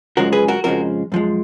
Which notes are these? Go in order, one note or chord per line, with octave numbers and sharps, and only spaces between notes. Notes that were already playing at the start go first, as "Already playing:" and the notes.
F#2 C#3 F3 G#3 F#4 A#4
G#4 B4
F#4 A#4
F2 C#3 F3 G#3 F#4 A#4
F#2 F3 G#3